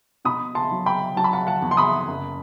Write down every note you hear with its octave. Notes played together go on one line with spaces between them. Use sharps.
B2 B5 D#6
A5 C6
F#3
G5 B5
F#3 A5
B5
F#5 A5
F#5 A5
E2
C6
B5 D#6
F#1